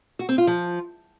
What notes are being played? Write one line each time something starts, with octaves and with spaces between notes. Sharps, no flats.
F#4
C4
F4
F3